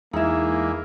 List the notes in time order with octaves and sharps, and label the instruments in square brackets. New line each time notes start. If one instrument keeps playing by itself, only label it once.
[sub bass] E2 [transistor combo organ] E3 G#3 [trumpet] A#3 [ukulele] D#4 E4